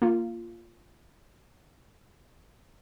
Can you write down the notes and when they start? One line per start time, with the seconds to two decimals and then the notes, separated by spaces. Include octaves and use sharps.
0.02 A#3 F4